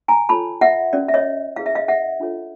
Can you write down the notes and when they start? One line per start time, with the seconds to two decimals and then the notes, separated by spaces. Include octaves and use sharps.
0.08 G#5 A#5
0.29 F4 A4 C#5 A5 B5
0.61 E5 F#5
0.93 C#4 F#4 A#4 D5
1.08 E5
1.14 C#5 D#5
1.56 E4 G#4 B4 F5
1.66 E5
1.75 D#5 F5
1.88 E5 F#5
2.20 D4 F4 A4 C#5